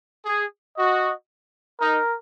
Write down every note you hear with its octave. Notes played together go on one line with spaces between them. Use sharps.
G#4
F#4 D#5
D#4 A#4